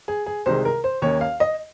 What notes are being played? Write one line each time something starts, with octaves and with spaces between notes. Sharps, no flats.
G#4
G#4
C2 C3 D#3 G#3 C5
A#4
C5
D#2 D#3 A#3 C#4 C#5
F5
D#5